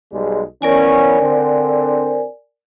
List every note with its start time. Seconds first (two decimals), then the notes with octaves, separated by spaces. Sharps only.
0.13 B1 G3 G#3
0.62 E3 B3 C#4 A#4 D5 G#5
1.21 D3 C4